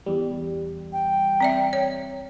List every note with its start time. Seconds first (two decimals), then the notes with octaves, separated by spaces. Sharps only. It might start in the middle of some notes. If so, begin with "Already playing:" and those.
0.06 E2 G3
0.93 G5
1.41 C4 D5 E5
1.73 C#5